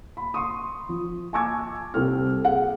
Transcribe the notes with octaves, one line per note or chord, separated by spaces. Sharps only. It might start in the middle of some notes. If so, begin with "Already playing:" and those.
B5
C6 C#6 D#6
F3
G#5 A5 C#6 D6 E6 G#6
C2 G3 C4 A4 G5 F6
G#4 F#5